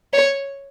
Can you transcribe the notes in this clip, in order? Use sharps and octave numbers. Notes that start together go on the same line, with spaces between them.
C#5